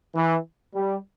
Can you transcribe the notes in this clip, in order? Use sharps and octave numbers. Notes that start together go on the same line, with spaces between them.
E3
G3